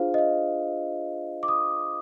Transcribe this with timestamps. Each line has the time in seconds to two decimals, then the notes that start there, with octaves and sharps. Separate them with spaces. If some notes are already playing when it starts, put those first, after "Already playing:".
Already playing: D4 F4 G#4 C5 F5
0.14 D#5
0.18 F5
1.43 D6
1.48 D#6